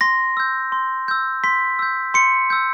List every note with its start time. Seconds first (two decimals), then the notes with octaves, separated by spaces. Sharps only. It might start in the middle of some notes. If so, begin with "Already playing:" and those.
0.01 C6 A#6
0.37 E6 G6
0.72 C6
1.08 E6 G6
1.44 C6 B6
1.79 E6 G6
2.14 C6 C#7
2.50 E6 G6